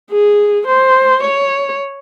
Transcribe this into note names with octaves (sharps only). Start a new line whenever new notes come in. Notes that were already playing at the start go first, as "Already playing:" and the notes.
G#4
C5
C#5